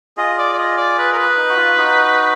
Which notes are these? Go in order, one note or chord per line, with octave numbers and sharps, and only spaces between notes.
F4 G#4 D#5
D5
D5
D#5
D5
B4
A#4
B4
D#4
F#4
F4
D#4 F#4